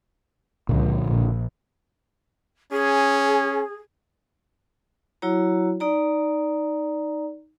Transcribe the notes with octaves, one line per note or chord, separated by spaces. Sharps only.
C#2 A#2 D3 F3
A#1
C#4 G#4
F#3 E4 F#4 C#5 A#5
D#4 D5 A#5